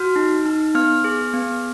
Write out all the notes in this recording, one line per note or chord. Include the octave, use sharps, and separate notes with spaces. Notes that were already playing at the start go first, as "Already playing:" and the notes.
Already playing: F#4 F6
D#4
D#4
B3 F6
G#4
B3